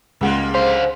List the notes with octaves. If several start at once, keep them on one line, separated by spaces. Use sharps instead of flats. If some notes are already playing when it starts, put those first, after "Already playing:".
C#2 G3 G#3 A#3 F#5
D3 C5 F5